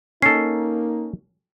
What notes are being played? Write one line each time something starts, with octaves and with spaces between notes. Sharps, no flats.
A#3 C#4 D#4 A4 C7